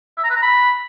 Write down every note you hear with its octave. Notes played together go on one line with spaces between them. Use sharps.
E5
A#5
B4
A#5
B5